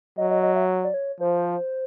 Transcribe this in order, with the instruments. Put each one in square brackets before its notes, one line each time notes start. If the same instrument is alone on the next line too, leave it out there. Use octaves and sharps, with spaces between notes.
[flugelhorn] F#3 [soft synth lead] D#5
[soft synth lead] D#5
D#5
E5
D5
C#5
[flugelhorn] F3 [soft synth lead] C5